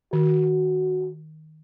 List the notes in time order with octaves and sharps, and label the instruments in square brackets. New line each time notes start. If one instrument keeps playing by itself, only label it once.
[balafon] D#3 [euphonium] F#4